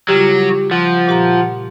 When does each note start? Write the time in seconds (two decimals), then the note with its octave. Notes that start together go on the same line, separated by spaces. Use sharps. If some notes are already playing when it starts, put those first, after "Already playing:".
0.08 C#3 F#3 G3 F4 G4
0.71 F3 F#5
1.07 A#2 G4 A#5